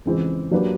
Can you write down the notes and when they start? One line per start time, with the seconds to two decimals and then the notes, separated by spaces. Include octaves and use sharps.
0.05 F2 C#3 E3 G#3 C4
0.51 F#3 A#3 D4 G4 B4